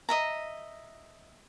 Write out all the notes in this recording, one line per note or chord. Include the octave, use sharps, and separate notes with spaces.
D#5 E5 A#5